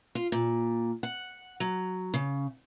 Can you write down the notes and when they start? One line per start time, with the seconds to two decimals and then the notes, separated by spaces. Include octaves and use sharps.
0.15 F4
0.32 A#2
1.03 F#5
1.60 F#3
2.14 C#3